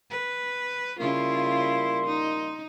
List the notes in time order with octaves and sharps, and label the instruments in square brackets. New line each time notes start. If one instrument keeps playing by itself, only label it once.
[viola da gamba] B4
[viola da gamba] C#3 E4 F4 [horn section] G3 A#3 C6
[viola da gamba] D#4